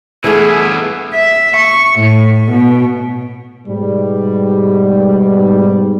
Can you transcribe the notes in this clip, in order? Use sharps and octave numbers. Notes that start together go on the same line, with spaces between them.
E3 G3 A3 B3 D4 E4 G#4
E5
C#6
A2
B2
G#2 B2 G3